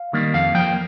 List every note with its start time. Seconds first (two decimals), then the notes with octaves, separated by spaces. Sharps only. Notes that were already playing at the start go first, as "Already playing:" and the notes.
Already playing: F5
0.13 D#3 G3 A#3
0.34 F2 F5
0.55 F3 A#3 G5